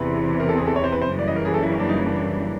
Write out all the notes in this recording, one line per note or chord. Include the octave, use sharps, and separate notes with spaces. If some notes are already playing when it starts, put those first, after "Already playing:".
Already playing: E2 C3 E3 B4
A#4
A4
G#4
A4
C#5
C5
B4
C5
F#2 C#3 E3 G3 A#3
D5
D#5
A#4
G#4
A4
E4
C#4
D4
D#4
D4